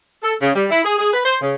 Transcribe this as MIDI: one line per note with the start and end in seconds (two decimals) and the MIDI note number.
0.22 0.35 69
0.42 0.52 49
0.55 0.65 55
0.70 0.81 64
0.84 0.98 68
0.99 1.10 68
1.13 1.21 71
1.25 1.37 72
1.41 1.55 49